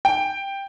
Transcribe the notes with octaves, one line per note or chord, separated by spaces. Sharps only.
G5